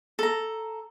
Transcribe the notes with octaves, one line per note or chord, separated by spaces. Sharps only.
A4 A#5